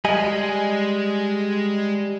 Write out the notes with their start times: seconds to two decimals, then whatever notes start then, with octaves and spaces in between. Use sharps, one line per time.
0.05 G3 G#3 D#5 G#5